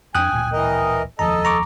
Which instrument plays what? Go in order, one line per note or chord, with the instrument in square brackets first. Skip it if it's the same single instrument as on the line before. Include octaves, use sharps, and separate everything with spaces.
[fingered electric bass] F2 D4 [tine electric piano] G5 D#6 F#6 [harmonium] G#5
[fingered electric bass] D1 A1 A#2
[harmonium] E3 A#4 D#5
[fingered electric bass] F1 D#2 F3 [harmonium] A4 D#5 [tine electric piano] A#5
[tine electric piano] A#5 C#6 D6